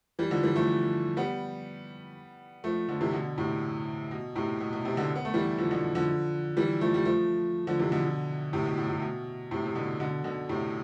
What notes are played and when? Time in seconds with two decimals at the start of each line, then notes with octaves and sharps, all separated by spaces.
0.19 E3 G3
0.31 D3 F3
0.43 E3 G3
0.56 F3 A3
1.17 G3 B3
2.64 F3 A3
2.89 D3 F3
3.01 C3 E3
3.13 B2 D3
3.38 A2 C3
4.11 B2
4.35 A2 C3
4.60 B2
4.73 B2
4.85 A2 C3
4.97 B2 D3
5.16 B3
5.25 A3
5.34 E3 G3
5.58 D3 F3
5.71 B2 D3
5.95 D3 F3
6.57 E3 G3
6.81 F3 A3
6.94 G3
7.05 F3 A3
7.67 D3 F3
7.79 C3 E3
7.92 B2 D3
8.53 A2 C3
8.65 B2
8.78 A2
8.90 A2
9.02 B2
9.51 A2 C3
9.66 C3
9.75 B2 D3
10.00 B2 D3
10.24 B2 D3
10.49 A2 C3